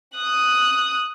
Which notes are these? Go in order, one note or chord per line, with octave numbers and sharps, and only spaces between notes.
D#6 F#6